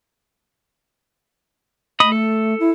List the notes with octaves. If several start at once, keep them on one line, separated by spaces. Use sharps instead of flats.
A3 D#5 B5 D#6
A4
E4